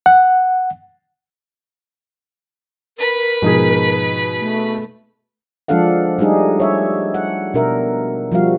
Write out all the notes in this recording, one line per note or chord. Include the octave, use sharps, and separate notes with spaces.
F#5
A#4 B4 B5
G#2 B2 F3 D#4 G#4
A3
F3 G#3 D4 A4 F5 F#5
G3 A3 D4 D#4 G#4
C#5 E5
F#5
B2 D4 A#4 E5
F3 G3 F#4 F5